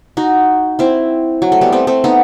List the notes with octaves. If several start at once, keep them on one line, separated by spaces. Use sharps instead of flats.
D#4 F#4
C4 E4
F#3
A3
G3 B3
A3 C4
A3 C4
B3 D#4